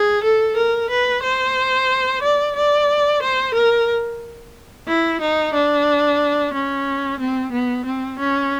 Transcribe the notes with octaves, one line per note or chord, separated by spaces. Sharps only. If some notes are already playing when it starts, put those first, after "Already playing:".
Already playing: G#4
A4
A#4
B4
C5
D5
D5
C5
A#4
E4
D#4
D4
C#4
C4
B3
C4
C#4